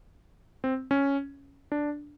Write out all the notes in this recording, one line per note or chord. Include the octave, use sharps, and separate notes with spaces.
C4
C#4
D4